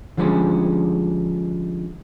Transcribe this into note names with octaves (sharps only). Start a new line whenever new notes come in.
D3 F3 G3 G#3 C#4